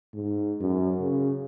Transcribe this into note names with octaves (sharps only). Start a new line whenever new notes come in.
G#2
F#2
C#3